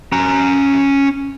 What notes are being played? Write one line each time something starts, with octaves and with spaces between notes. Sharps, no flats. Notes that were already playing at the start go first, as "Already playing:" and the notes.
C#4 A#5